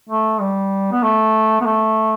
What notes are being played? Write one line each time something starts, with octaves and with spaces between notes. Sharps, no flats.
A3
G3
B3
A3
B3
A3